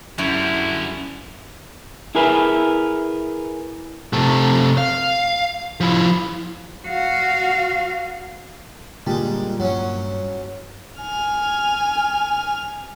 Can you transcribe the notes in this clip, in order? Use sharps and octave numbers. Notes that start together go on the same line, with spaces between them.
F#2 D3 G3 E4
E4 G#4 A#4 B4 E5
C3 A3
F5
F3 E4
F#4 F5
A#2 D3 G3 G#3
G2 F#3 C#4
G#5 F6